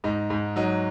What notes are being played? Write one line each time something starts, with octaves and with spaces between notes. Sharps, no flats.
G#2 D#4
G#2
F#3 D#4